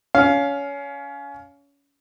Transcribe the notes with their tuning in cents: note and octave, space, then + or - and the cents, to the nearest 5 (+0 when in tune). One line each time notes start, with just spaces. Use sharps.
C#4 +25 F5 +0